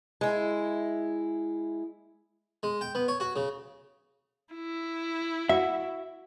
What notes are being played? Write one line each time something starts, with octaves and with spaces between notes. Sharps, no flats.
G#3 E4
G#3
G5
B3
C#5
F#4
C#3
E4
F#4 E5